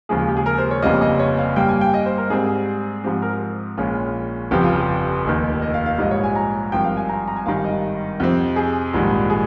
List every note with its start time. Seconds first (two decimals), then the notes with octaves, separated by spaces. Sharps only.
0.09 D#2 C#3 F3 G#3 G#4
0.19 F4
0.28 G4
0.37 G#4
0.46 A#4
0.58 C5
0.71 C#5
0.82 G1 F2 C#3 G3 A#3 D#5
1.01 D#5
1.19 C#5
1.38 F5
1.56 G2 G3 A#3 G5
1.69 G#5
1.81 G5
1.94 D#5
2.06 C5
2.18 A#4
2.30 G#2 G3 C4 G#4
3.04 G#2 F3 C4 G4
3.22 A#4
3.78 A#1 A#2 G#3 C#4 F4
4.51 G1 F2 C#3 F3 G4
4.64 F4
4.76 G4
5.25 F1 D#2 D#3
5.62 D#5
5.74 F5
5.86 F5
5.98 A#1 G#2 G3 D#5
6.11 C#5
6.23 G#5
6.35 A#5
6.72 G#1 G2 F3 C4 G5
6.84 F5
6.97 G#5
7.09 A#5
7.28 A#5
7.36 G#5
7.46 G#1 G2 D#3 G3 F5
7.64 D#5
8.20 F2 C3 F3 C4
8.56 G#4
8.93 A#1 G#2 D#3 G3
9.30 G#4